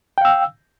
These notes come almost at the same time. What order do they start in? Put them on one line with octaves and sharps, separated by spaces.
G5 F5 E6